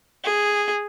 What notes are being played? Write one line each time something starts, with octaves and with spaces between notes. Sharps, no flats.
G#4